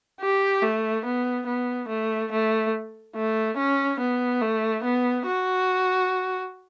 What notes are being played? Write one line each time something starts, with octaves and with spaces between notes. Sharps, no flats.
G4
A3
B3
B3
A3
A3
A3
C#4
B3
A3
B3
F#4